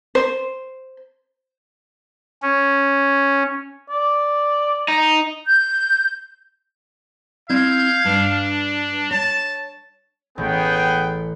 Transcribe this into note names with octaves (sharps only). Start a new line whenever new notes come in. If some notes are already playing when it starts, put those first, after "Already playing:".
C5
C#4
D5
D#4
G6
C4 E4 D#5 F5 G6 G#6
G2 D4
C#5 A5
A1 B3 G#4 G5